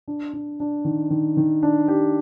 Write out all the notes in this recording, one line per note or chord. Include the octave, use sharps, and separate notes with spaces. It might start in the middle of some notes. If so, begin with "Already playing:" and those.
D4
D4
D4
D#3
D#3
D#3
D4
G4